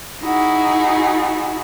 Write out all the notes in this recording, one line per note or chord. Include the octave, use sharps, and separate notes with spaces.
D#4 E4 F#4 G#4